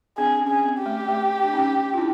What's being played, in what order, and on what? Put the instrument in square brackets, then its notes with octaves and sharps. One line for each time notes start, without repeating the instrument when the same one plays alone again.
[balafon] C4 D4 [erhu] G#4
[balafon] D4
C#4
[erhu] G#4
[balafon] C4
[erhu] G4
[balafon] A3
A3
D4
C#4 D#4
F4
D4 E4